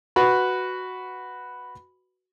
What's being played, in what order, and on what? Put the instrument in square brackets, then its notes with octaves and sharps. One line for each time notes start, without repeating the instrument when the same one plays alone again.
[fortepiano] F#4 B4 B5